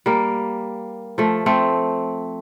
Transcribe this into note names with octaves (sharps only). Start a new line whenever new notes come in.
G3 A#3
F3 A3
A3 C4